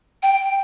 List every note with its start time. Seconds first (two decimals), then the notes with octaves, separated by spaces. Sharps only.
0.23 G5